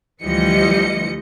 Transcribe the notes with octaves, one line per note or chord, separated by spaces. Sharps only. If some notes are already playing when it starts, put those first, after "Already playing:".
D2 E3 F3 G3 D#5 C#7